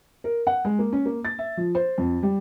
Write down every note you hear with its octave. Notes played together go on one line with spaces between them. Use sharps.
A#4
F#5
G#3
A#3
C#4
A#3
A6
E5
F3
C5
F2
G3